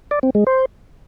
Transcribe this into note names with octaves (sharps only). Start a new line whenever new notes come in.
D5
C4
G#3
C5